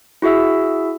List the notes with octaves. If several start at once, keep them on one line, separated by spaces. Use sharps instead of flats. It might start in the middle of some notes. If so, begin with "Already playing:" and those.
E4 F#4 G#4 E5 E6